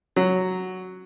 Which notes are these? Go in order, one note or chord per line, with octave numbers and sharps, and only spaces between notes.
F#3